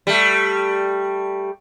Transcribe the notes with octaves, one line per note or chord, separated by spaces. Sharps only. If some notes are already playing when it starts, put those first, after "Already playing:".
G3 A3